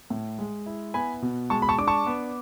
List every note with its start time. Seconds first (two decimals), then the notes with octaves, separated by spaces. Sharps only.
0.10 A2
0.39 G#3
0.66 E4
0.94 B3 G#5 B5
1.22 B2
1.50 G#3 A5 C#6
1.62 B5
1.69 A5 C#6
1.78 D4 D6
1.87 A5 C#6
2.06 B3